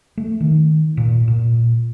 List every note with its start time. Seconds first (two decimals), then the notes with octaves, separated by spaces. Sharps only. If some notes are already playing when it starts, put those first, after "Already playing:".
0.17 A3
0.40 D#3
0.97 A#2
1.28 A#2